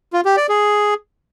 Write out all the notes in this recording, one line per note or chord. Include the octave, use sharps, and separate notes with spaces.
F4
G4
D5
G#4